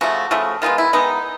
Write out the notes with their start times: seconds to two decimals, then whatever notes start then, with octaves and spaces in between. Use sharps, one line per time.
0.01 C#3 F3 A3 F#4
0.31 C#3 F3 A3
0.62 D#3 G#3 B3 F4
0.78 E4
0.93 D#3 G#3 B3 D#4